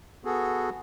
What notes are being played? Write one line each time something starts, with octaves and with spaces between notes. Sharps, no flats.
B3 F#4 G#4 A4